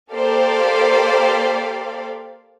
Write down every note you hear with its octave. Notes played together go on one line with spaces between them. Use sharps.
A#3 G4 A4 C5 D5 F5